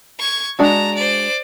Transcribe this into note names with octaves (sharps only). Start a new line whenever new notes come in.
C#6 G#6
G#3 D4 F#4 A5 A#5
C5 D5